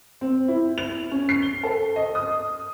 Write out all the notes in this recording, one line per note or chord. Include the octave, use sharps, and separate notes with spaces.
C4
E4
F7
C#4
C7
G7
A4
D#5
D#6